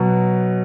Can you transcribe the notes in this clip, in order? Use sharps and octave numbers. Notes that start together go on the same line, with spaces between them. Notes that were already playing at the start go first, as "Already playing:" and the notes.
Already playing: B2 F#3